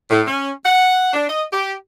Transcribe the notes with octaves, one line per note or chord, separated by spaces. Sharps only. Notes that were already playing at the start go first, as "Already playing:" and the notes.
A2
C#4
F#5
D4
D#5
G4